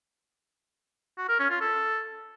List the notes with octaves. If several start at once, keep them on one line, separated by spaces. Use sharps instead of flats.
F#4
A#4
C#4
F4
A4